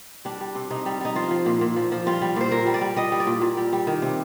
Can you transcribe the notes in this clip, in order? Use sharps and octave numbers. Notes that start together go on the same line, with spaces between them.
G3 D4
G3
C3
C3 D#4
G3
G3 D#4
F3 F4
F3
A#2
A#2
F3
F3
G3 F4
G3
A#2 C5
A#2 A#4
G3
D5
G3
G3 D#5
G3
D5
A#2
A#2
G3
G3
D#3
C3